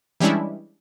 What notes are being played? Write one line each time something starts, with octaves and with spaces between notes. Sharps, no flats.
E3 G3 G#3 C#4 D4 E4